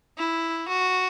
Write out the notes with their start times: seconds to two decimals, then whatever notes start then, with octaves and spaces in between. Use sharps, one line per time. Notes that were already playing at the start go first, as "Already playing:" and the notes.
0.18 E4
0.68 F#4